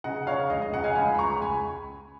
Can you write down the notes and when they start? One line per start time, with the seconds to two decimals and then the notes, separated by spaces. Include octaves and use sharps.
0.04 C#3 D#5 F#5
0.27 C#3 C#5 F5
0.50 C#2 D#5
0.62 D#5
0.72 C#3 D#5 F#5
0.84 F5 G#5
0.95 C#2 G#5 B5
1.14 B5
1.19 C#2 A#5 C#6
1.41 C#2 G#5 B5